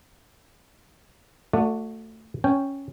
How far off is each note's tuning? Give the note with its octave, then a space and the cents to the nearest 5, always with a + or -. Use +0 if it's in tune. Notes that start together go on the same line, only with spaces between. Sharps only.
A3 +15 F#4 -20 D5 +0
C#4 +0 G5 +0